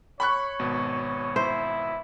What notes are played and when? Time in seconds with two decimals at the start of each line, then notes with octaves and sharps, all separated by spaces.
0.20 C#5 B5 C#6 F#6
0.59 G#1 B2
1.36 E4 C5